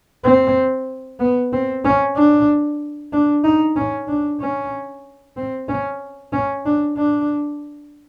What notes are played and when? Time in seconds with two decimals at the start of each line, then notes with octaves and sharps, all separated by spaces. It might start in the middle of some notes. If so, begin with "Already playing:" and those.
0.24 C4
1.19 B3
1.53 C4
1.84 C#4
2.16 D4
3.12 D4
3.44 D#4
3.76 C#4
4.08 D4
4.40 C#4
5.37 C4
5.69 C#4
6.33 C#4
6.65 D4
6.97 D4